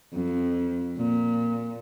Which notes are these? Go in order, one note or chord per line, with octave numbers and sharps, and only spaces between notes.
F2
A#2